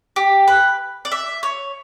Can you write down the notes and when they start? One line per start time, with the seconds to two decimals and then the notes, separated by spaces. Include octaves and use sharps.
0.16 G4
0.48 B4
1.05 D5
1.12 E5
1.43 C#5